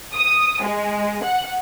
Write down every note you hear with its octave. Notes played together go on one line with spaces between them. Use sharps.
D#6
G#3
F#5